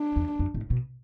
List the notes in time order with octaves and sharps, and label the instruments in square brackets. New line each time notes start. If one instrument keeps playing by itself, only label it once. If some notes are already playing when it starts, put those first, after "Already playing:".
Already playing: [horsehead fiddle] D4
[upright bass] E2
F#2
A2
B2